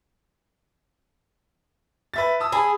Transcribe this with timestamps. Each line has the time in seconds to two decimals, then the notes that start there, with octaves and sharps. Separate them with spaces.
2.14 B4 E5 A6
2.40 A5 D#6 E6
2.52 G#4 A5 B5